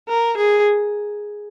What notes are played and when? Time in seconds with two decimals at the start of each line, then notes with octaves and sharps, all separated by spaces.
0.09 A#4
0.37 G#4